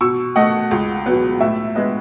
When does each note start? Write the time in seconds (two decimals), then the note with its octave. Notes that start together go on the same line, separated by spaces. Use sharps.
0.01 B2 C#6 E6
0.36 A3 D#5 F#5
0.71 C#2
1.06 B2 F#3 B3
1.40 A2 E5
1.75 G#3 B3 D#5